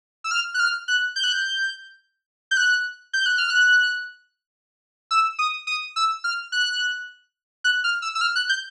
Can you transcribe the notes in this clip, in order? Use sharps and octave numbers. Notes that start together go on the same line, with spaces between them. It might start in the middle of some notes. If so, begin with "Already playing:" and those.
E6
F6
F#6
F6
F#6
G6
F#6
G6
G6
F#6
G6
F#6
F6
F#6
E6
D#6
D#6
E6
F6
F#6
F#6
F6
E6
E6
F6
F#6
G6